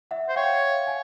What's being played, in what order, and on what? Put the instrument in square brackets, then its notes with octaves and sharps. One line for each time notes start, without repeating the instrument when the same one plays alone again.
[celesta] E5 F#5
[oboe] C5
[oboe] C#5 [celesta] F5 G5
[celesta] F#5 G#5